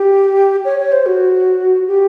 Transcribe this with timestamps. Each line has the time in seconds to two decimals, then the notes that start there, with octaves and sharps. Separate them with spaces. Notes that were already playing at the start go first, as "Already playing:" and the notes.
Already playing: G4
0.65 C#5
0.79 C#5
0.92 C5
1.06 F#4
1.87 G4